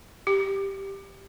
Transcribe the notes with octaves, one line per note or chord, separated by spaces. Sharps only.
G4